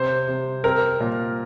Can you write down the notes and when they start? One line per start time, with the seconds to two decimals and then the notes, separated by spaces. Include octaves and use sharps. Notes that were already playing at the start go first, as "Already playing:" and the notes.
Already playing: C3 C5
0.28 C3
0.64 C4 A#4
1.00 A#2